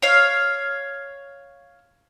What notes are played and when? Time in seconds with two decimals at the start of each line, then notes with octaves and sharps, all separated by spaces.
0.02 C#5 F5